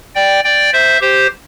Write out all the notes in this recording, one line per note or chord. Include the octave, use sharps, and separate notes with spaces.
D5 G5
D5 G5
C5 E5
G4 C5